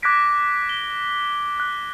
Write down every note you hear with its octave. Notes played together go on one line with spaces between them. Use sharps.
D6 F#6 G#6 A#6 B6 D7
G7
F#6